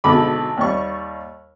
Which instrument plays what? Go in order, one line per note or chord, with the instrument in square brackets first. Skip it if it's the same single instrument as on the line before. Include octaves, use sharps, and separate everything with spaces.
[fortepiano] G#1 B2 D3 B5 D6
D#2 G3 C#6